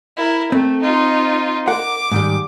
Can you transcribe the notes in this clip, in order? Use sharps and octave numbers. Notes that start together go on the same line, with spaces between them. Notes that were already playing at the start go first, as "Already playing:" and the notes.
E4 A#4
A3 C4
D#4 F4
A#4 F#5 D6
G#2 D#3 G3